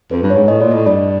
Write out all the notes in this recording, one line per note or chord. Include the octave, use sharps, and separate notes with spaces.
F2 B4
G2
C#5
G#2
A2 D#5
A#2 D5
A2 D#5
G2 D5